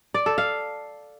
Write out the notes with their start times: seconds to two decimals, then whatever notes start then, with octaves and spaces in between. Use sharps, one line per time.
0.14 D5
0.26 A4
0.38 F5